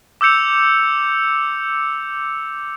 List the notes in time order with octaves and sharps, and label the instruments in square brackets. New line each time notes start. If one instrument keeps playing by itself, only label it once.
[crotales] D6 E6 G6 C#7 F7